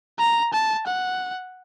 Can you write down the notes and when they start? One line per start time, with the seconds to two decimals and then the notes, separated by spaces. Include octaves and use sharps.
0.19 A#5
0.53 A5
0.86 F#5